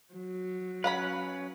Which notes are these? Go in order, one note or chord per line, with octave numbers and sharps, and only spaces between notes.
F#3
C#4 B4 F5 F#5 B5